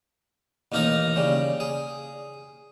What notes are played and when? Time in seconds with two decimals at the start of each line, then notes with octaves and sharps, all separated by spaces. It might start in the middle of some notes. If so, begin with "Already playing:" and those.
0.72 A1 D#2 A#3 D#4 A#4 A#5
1.16 C#3 G3
1.60 G#4